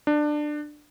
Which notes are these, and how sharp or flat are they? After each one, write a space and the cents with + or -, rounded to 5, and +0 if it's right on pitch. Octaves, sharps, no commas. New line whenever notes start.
D4 +20